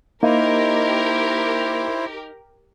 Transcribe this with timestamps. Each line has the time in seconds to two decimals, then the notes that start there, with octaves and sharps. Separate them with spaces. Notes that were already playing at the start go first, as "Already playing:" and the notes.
0.23 A#3 D#4 E4 G4 A#4 C5